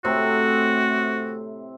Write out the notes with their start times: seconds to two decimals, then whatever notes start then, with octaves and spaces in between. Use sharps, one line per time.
0.04 A2 C3 C4 F#4